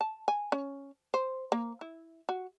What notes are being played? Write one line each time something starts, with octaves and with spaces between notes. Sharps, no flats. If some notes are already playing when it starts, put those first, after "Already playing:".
A5
G#5
C#4
C5
A#3
E4
F#4